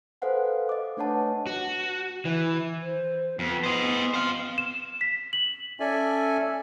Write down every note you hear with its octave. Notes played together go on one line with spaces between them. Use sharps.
A4 B4 C5 F5 F#5 G#5
D#5 D6
A3 D4 B4 C#5 F#5 A5
F#4
E3
C5
F2 B3
C5 D#5
C4 C5 F5
E7
B6
F#7
C#4 A4 D5 E5 G#5